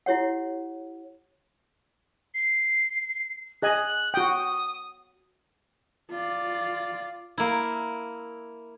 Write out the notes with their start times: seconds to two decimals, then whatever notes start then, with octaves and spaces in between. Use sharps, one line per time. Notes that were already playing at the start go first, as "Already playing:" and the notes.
0.06 E4 G4 C#5 F#5
2.34 C7
3.62 G#4 D#5 G#5 F#6
4.14 F#4 G5 D#6
6.10 F4 D5
7.38 A#3 E4